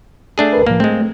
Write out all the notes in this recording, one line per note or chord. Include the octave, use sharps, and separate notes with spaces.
A3 D4 G#4
D2 A#4 B4
C2 A2 F3 A#3
G#3 A3 C4